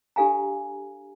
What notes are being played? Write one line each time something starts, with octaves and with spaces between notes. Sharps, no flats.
D4 G4 A4 F5 G#5 A#5